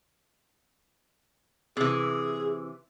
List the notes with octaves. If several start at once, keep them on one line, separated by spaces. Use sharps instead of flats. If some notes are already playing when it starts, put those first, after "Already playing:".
C3 E3 G#4